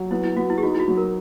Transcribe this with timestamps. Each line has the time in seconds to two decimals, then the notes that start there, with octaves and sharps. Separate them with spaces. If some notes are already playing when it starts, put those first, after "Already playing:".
Already playing: F#3
0.11 B3 E4
0.24 E4
0.36 B3 F#4
0.50 E4
0.58 G#4
0.63 D#4 F#4
0.75 E4
0.80 F#4
0.88 F#3
0.98 A#4